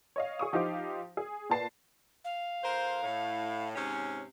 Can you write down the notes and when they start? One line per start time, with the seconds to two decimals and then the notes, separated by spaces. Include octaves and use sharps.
0.16 C#5 D#5 F5
0.39 G#4 C#6 D#6
0.53 F3 D#4 G4 C5 F5 D6
1.17 G#4
1.50 A#2 B4 A5 C7
2.24 F5
2.63 F2 A#4 C5
3.04 A2
3.76 G#2 C3 C#4